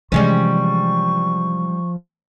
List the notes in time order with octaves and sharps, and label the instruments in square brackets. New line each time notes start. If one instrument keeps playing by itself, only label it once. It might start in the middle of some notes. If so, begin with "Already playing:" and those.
[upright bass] C3 E3 [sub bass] F3 [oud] G3 G#3 C#4 [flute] C#6